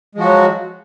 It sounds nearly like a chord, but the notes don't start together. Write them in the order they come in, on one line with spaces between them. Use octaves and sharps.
G#3 F3 F#4 F#3